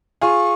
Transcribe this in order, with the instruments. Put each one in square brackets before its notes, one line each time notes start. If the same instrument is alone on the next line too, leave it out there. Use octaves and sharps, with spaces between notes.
[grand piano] F4 G#4 [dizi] C#6